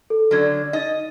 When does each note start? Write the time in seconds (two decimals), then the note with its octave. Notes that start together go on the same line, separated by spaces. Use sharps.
0.10 A4
0.31 D3 F#3 F6 G#6
0.73 D#4 D#5 A6